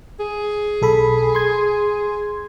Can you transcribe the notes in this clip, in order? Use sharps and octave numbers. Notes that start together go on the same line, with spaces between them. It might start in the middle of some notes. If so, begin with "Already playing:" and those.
G#4
B1 A4 B5
C6 G#6